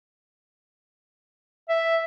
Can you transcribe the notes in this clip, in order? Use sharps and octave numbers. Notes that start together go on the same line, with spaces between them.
E5